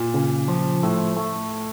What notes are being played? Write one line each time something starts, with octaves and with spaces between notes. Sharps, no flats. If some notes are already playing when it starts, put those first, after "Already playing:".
Already playing: A#2
C#3
F3
A2 A3
A3